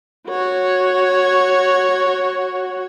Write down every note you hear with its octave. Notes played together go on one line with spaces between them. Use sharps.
F#4 C#5